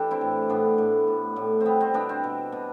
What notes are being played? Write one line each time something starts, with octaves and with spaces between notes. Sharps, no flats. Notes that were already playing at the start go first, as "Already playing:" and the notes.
Already playing: E3 D4 G4 A4
C4 E4
A2
A2 B3 D4
A2
A2
A2
C4
G3 B3
C4
B2 B3 D4
C4
B2
B2